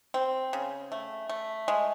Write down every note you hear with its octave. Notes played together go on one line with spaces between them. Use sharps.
C4
C#3
A3
A3
G#3